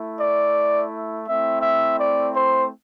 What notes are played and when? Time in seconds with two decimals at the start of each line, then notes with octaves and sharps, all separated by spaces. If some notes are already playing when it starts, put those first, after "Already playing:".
Already playing: A3 E4
0.20 D5
1.27 A3 C4 E4 E5
1.62 E5
1.98 D5
2.34 C5